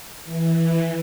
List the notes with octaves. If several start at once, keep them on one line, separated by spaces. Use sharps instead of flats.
E3